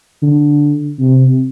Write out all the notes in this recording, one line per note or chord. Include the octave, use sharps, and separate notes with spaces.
D3
C3